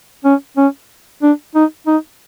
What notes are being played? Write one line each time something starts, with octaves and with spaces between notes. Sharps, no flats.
C#4
C#4
D4
D#4
D#4